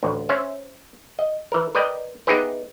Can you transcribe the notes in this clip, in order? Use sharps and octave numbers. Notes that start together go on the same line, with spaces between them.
A1 D2
C#4 C5 E5
D#5
E3 A#4
A#4 B4 D5 D#5 G5
B3 D#4 E4 G4 G#4 B4